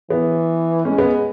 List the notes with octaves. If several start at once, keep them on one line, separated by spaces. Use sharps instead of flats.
E3 B3
G#3 C#4
B3